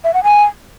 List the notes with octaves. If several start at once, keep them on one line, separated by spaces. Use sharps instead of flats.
E5
F#5
G#5